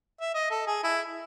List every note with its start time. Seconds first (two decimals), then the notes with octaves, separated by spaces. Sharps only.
0.21 E5
0.34 D#5
0.50 A4
0.67 G#4
0.84 E4